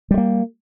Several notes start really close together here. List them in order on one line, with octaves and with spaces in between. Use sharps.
G3 G#3 A#3